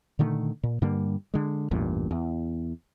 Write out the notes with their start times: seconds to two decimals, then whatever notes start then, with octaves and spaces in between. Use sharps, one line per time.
0.19 A#2 D3 D#3 A3
0.63 A#2
0.82 G2 D3 G3 A#3
1.34 D3 G#3
1.71 A1 E2 G2 A#2
2.11 E2